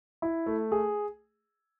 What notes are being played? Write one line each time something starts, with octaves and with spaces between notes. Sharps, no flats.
E4
A3
G#4